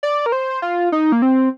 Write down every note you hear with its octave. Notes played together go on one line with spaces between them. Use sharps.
D5
A#4
C5
F4
D#4
A#3
C4